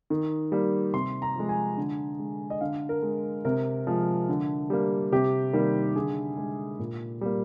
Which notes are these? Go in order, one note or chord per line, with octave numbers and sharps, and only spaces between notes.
D#3
G3 A#3
C3 C6
A#5
F3 G#3
G#5
D3
G#3
D#5
D3 F5
A#4
G#3
C3 A#4
F3 G#3
D3
G3 A#3
C3 G4
D#3 G3 A#3
D3 G#4
G#3
A#2
G3 A#3